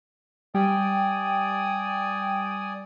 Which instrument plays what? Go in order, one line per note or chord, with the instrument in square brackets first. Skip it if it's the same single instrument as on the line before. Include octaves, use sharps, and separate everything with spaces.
[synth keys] G3 [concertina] D5 G#5 D#6 [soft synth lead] G5